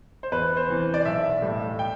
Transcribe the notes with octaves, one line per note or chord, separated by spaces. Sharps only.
C5
E2 B4
C5
C3 E3
D5
B1 E5
A2 G3
G5